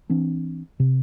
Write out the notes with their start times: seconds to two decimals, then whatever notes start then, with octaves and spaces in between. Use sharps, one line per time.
0.10 E3 C4 D4
0.80 C3